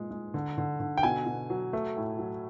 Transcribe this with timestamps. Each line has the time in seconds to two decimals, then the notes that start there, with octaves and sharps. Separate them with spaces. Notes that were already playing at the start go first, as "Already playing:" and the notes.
Already playing: A#2 G#3
0.11 G#3
0.34 D3
0.58 D3
0.80 D3
0.97 G5
1.03 B2 G#5
1.26 B2
1.50 F#3
1.73 A3
1.97 A2
2.19 F#3